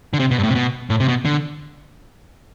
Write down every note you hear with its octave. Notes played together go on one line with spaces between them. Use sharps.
D3
C3
B2
G2
A2
C3
B2
A2
C3
B2
D3